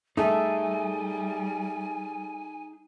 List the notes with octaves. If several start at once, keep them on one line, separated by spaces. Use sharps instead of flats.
G3 A3 D#4 G#4 E5 G#5